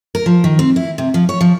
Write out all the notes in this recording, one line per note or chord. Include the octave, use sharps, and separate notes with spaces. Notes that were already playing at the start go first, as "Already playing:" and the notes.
A#4
F3
D#3
C4
E4
C3
F3
C#5
F3